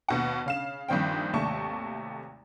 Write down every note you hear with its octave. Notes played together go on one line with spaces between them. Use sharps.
D#2 B2 F#5
C#3 F5 E7
A#1 G2 D#3 C4 G5
G#1 D#2 C3 A3 A5 C#6